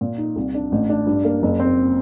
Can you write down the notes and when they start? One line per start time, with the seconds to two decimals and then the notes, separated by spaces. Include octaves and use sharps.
0.01 A#2
0.18 D#4
0.36 C2
0.54 D4
0.72 A1
0.89 D4
1.07 G2
1.25 A#3
1.42 F#1
1.60 C4